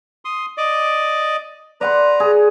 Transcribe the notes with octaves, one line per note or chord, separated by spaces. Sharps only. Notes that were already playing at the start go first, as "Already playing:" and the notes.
C6 D#6
D5 D#5 D6
B4 D5 F#5 A#5 C6
G#4